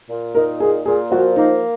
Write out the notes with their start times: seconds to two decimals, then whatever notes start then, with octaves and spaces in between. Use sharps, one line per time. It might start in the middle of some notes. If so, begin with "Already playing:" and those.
0.09 A#2
0.35 D#4 A#4
0.60 A#2 G#4
0.86 A#2 G#4
1.11 F3 F#4
1.36 A#3 D#4